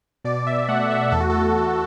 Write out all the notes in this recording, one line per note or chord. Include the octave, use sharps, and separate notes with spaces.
B2 D5
B2 E5
A3 F#5
A3 E5
E2 A4
F#4
A3 A4
E2